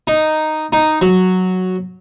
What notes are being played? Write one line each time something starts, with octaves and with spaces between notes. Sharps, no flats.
D#4
D#4
F#3